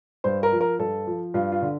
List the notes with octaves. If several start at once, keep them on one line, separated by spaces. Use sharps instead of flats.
G2 C5
A#4
F3
A#4
G2 A4
F3
G2 F4
F4
D3